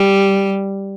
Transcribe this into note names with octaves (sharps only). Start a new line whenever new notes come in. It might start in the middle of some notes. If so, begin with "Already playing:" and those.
Already playing: G3